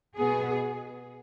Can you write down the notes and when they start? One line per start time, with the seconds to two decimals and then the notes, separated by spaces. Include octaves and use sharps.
0.17 B2 B3 G#4